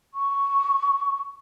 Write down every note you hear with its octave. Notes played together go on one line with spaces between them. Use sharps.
C#6